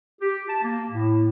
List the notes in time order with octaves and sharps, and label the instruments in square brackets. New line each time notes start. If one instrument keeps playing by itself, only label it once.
[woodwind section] G4
A5
A#3
A2